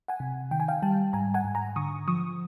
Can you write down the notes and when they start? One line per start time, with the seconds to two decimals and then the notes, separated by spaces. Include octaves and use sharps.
0.08 F#5 G#5
0.20 C3
0.51 D#3 G5
0.60 G#5
0.68 F5 G5
0.82 G3 G5 A5
1.13 G#2 G#5 A#5
1.34 F#5 G#5
1.45 G#2
1.55 G#5 A#5
1.76 D3 C#6 D#6
2.08 F3 C#6 D#6